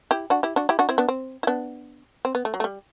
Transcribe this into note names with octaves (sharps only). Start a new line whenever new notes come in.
E4 G4
D4 F#4
E4 G4
D4 F#4
E4 G4
D4 F#4
C4 E4
B3 D4
C4
E4
B3 D4
C4
B3
A3
F#3
A3
G3